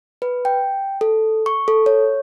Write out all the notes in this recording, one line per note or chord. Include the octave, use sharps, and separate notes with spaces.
B4
G5
A4
C#6
A4
C#5